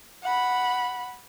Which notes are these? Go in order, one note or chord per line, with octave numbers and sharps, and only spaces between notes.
F#5 B5